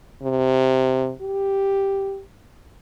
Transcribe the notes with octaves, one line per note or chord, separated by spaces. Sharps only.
C3
G4